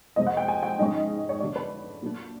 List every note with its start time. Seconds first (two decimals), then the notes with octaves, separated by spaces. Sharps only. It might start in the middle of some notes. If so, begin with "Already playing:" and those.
0.16 F2 C3 F3 G#3 C4 D#5
0.27 F#5
0.37 G5
0.48 G#5
0.63 G5
0.78 G#2 F3 G#3 C#4 D#5
1.29 C#5
1.40 D3 F#3 A3 D5
1.56 B4
2.02 A#2 F#3 A3 D4